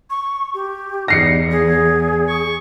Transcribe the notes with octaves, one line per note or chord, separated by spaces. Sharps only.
C#6
G4
E2 D#4 A#6 C7 C#7
G#4
C#6